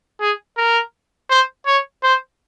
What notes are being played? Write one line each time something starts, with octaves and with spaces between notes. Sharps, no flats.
G#4
A#4
C5
C#5
C5